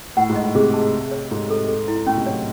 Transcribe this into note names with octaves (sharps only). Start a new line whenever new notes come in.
A2 F#5
G#2
D#5
A2
C3 G#4
A5
E5
C#5
G#2 A4
A4
A4
E4
A2 C#4
C3
F#3 C#5